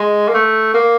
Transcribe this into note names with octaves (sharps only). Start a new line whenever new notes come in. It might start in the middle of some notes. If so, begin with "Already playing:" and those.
Already playing: G#3
A#3
A3
A#3